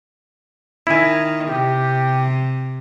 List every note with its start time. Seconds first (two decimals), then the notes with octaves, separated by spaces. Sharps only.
0.87 D#3 E4 G#5
1.47 C3 G4